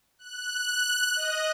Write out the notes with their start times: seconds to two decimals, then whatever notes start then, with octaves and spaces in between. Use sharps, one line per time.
0.19 F#6
1.16 D#5